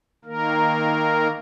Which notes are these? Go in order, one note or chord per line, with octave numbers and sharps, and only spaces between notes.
D#3 A#3 A#4